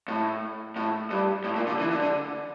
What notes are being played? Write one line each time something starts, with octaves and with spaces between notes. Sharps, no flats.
A2
A2
G2
A2
A#2
D3
E3
D3
D3